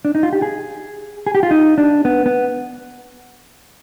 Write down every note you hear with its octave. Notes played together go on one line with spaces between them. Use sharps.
D4
D#4
F4
G4
G#4
G#4
G4
F4
D#4
D4
B3
B3